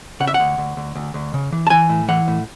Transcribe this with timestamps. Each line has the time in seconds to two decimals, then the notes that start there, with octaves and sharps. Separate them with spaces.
0.20 C#3 F#5
0.27 E5
0.34 F#5
0.40 D2
0.58 D2
0.77 D2
0.95 D2
1.14 D2
1.34 C#3
1.52 E3
1.67 A5
1.70 E3 G#5
1.89 A2
2.08 E3 F#5
2.28 A2